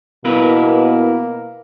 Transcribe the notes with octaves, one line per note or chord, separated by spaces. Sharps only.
B2 A#3 B3 E4 A#4 B4